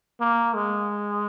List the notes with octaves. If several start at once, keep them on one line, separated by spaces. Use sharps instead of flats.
A#3
G#3